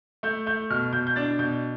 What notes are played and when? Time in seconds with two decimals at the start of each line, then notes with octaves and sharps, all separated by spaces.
0.23 A3 G6
0.46 A3 G6
0.70 B2 F6
0.93 B2 G6
1.07 G6
1.16 D4 A6
1.39 B2 G6